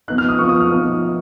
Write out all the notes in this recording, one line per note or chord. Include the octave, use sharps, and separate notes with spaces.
F3 B3 D#4 F#6
F6
D#6
F3 B3 D#4 C#6
D#6
F6
F3 B3 D#4